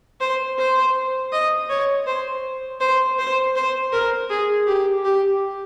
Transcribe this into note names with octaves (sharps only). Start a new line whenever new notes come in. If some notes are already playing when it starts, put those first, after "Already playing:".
C5
C5
D#5
C#5
C5
C5
C5
C5
A#4
G#4
G4
G4